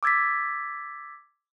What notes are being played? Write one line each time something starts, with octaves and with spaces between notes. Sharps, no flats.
D6 E6 G#6 A6 B6